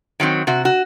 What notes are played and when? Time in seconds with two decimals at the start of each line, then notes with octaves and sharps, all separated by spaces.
0.20 D#3 F#3 C4
0.47 C3 F#4
0.65 F#4